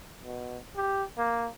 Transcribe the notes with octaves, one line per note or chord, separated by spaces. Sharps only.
B2
G4
A#3